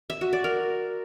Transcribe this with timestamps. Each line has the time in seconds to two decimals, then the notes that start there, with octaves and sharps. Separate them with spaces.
0.10 E5
0.21 F#4
0.33 D5
0.44 A#4